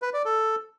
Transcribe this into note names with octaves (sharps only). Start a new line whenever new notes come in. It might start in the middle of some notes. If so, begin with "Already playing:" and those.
B4
D5
A4